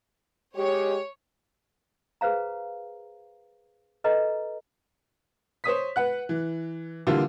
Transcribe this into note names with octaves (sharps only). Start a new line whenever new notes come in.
G#3 G4 C#5
G#4 B4 C5 F5 A#5
A4 B4 D#5 A#5
C5 C#5 D#6 B6
B4 F#5 F#6
E3
D3 E3 G3 A#3 F4 G4